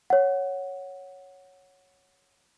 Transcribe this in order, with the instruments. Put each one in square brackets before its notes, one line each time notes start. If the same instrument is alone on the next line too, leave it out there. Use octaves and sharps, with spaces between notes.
[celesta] C#5 F#5